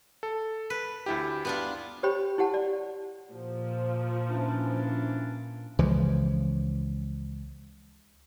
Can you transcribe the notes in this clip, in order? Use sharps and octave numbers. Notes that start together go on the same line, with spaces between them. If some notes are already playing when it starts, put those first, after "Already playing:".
A4
B4
D2 E4 G4
B3 D4 F4
G4 C5 C#5 G5 B5
E4 G4 F#5 A5
D5
A#2 F3
E3 C#4 D4
C#2 E3 F3